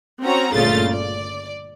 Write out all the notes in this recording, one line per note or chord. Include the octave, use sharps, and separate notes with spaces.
C4 C#4 F#4 A#5
G1 A#2 C#3 A3 F4 A6
D5